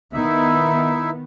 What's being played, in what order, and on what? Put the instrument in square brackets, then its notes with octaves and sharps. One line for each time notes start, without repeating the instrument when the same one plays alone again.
[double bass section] D#3 B3 [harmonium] D#4 E4 E5